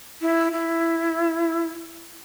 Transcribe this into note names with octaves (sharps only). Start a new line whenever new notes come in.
E4
E4